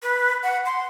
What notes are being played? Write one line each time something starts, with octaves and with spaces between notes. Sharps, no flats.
B4
F#5
C6